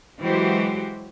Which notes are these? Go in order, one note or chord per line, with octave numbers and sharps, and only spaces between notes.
E3 F#3 G#3 F#4 G4 C5